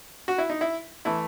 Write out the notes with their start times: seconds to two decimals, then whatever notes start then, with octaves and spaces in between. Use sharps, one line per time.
0.28 F#4
0.38 E4
0.50 D#4
0.61 E4
1.05 E3 A3 E4